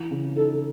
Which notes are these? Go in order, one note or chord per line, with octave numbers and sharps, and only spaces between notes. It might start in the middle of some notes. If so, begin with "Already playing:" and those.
Already playing: E3
C#3
D#4 A4